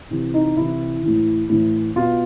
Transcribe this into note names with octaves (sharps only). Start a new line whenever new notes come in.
C3 E3
D#4
C3 E3 E4
A2 E3
A2 E3
B2 F4